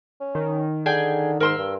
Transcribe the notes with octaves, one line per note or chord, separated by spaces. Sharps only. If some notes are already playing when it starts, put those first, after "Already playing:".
C#4
D#3
D3 G#4 G5 G#5
G#2 A#4 C6 E6
G2